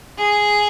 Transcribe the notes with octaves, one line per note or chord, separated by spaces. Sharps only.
G#4